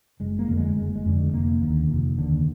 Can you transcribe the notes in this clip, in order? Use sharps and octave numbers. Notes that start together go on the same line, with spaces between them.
F#1 G#3
A#3
F2 D3
G#3
F#1 G#3
G#3
F2 D3
F1 A#3
D#2 D3
F1
D#2 D3